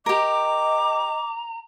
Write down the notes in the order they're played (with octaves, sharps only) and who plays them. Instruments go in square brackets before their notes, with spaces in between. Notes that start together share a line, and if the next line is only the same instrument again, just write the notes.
[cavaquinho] G4 A#4 [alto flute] D#5 [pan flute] A#5 [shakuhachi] D6